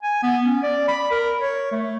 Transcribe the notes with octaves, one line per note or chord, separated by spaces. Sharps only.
G#5
B3
C#4
D5
B5
A#4
C#5
A3